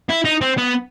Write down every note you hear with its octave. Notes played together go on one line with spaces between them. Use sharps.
E4
D#4
C4
B3